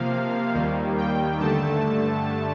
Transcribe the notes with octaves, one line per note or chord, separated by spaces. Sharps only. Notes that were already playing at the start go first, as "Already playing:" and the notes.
Already playing: C3 F3 A#3 F5
D#2 D#3 G3 A#3
G5
G2 D3 A3 A5